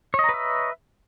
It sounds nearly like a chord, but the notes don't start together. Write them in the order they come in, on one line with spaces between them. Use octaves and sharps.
C#5 D#5 A#5 B4 E5